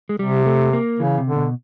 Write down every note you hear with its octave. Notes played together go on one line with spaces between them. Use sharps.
G#3
C3 G3
A3
A#3
C#3 E3
C3
D3
B2